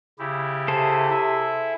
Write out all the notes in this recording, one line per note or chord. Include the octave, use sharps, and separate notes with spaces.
C#3 E4 G4
C3 G#4 A4 C5
E4 E5